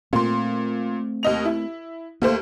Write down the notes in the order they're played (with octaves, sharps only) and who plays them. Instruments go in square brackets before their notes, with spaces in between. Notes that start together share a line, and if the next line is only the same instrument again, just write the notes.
[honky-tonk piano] A#2 C6 [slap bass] A3 C4
[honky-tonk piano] D#2 D#5 F7
E4
[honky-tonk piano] D#2 A3 C5 [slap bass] A#3